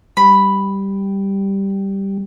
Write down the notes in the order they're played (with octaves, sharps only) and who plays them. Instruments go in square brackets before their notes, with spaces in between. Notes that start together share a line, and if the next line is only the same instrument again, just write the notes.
[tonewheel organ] G3 [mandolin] B5